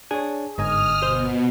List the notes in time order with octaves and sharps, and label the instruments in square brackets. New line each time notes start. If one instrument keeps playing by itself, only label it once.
[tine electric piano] D4 C#5 [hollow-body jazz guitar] G#4
[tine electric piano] G1 D#5 G#5 [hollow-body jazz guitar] G#2 [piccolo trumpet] D#6 [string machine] F6
[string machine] B2 [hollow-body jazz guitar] C5